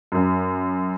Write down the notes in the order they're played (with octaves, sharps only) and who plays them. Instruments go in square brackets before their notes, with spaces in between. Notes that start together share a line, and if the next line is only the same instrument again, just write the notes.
[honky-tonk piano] F#2